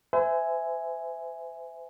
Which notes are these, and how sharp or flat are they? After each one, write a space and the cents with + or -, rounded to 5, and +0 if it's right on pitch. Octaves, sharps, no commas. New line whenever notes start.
C5 -40 E5 +0 G#5 +0